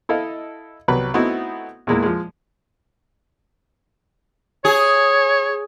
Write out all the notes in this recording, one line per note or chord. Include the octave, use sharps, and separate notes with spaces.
E4 A4 D#5 F5
C2 F#3 B3 B4
A3 B3 C4 D#4 E4 F#4
E2 A#2 G#3 A#3 E4
F3 G#3
G#4 C#5